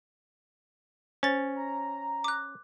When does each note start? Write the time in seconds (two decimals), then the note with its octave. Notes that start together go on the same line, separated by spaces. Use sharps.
1.23 C#4 C5 A6
1.56 A#5
2.24 D6 F#6